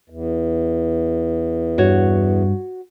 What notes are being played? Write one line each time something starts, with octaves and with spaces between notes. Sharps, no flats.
E2
G2 F#4 C#5